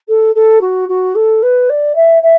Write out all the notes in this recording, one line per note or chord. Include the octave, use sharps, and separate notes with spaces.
A4
A4
F#4
F#4
A4
B4
D5
E5
E5